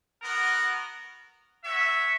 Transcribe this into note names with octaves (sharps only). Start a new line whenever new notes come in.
B3 F#4 A#4
F#4 C#5 E5